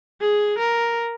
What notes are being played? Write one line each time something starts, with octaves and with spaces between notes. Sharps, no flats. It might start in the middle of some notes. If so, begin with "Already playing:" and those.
G#4
A#4